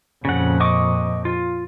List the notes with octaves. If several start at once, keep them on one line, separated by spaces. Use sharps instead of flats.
F2 A#2 C#3 F#5
D#5 C#6 D6
F4